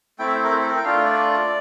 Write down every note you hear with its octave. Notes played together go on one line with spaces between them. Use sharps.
A3 C4 E4 G5
E5
C5
A#4
C5
A4
A#4
G5
A3 D4 F4 F5
D5